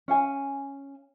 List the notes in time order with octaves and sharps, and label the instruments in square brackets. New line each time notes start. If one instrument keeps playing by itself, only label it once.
[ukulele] C#4 F5 G#5